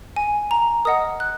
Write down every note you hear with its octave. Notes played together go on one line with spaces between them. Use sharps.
G#5
A#5
A#4 D#5 F#5 D#6
F#6